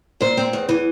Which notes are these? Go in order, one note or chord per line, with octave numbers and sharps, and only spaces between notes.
A#2 C5
C4
E2
E3